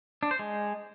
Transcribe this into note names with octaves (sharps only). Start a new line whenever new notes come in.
D4
C5
G#3